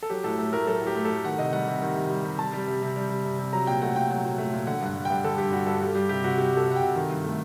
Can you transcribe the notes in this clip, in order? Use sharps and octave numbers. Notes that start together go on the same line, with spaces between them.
A4
F#3 G4
A2 A4
A3 A4
A2 A#4
F#3 A4
A2
G4
A3
A2 A4
D#3 F#5
C3 D#5
G3 F#5
C3
D#3
C3
G3
C3
G3 A5
G3
C3
C3
G3
G3
C3
C3
F#3 A#5
A#2 G5
A3 F#5
A#2 G5
F#3
A#2
A3
A#2
D3 F#5
G2 F#5
G3
G2 G5
D3 A4
G2 G4
G3 F#4
G2 A4
G3 G4
G3 G4
C3 G4
C3 F#4
G3 G4
G3 A4
C3 F#5
G5
C3
D#3
G2
A3